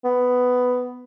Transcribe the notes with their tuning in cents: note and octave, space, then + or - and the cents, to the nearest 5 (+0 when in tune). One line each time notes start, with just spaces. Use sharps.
B3 +10